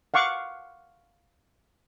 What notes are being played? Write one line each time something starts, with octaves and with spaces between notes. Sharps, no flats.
F5 F#5 C#6 D6